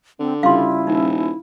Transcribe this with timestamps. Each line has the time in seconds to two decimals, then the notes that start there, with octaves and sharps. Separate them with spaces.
0.19 D3 C4
0.43 C#3 G3 E4 F4 F5 C6
0.87 D#1 D#4